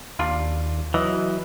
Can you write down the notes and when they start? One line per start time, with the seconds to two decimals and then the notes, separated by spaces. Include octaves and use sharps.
0.19 D#2 D4 F4 D5
0.94 E3 F#3 D#5